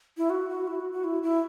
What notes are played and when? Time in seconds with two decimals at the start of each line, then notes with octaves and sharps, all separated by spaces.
0.17 E4
0.30 F#4
0.49 F#4
0.67 E4
0.80 F#4
0.92 F#4
1.04 E4
1.23 E4